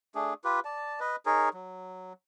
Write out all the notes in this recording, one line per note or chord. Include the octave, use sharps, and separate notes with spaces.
A3 D4 G#4
F4 G4 B4
D5 A5
B4 D#5
D#4 G#4 A#4 C#5
F#3